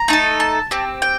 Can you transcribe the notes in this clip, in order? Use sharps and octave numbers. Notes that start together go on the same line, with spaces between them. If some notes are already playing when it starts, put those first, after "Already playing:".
Already playing: A#5
A3 D#4 A4
A5
C4 G4
G5